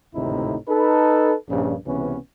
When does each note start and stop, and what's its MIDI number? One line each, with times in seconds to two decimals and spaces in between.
0.14 0.55 32
0.14 0.55 38
0.14 0.55 45
0.14 0.55 48
0.14 0.55 63
0.14 0.55 64
0.68 1.34 63
0.68 1.34 69
0.68 1.34 71
1.49 1.74 34
1.49 1.74 43
1.49 1.74 49
1.86 2.17 37
1.86 2.17 48
1.86 2.17 52
1.86 2.17 59
1.86 2.17 61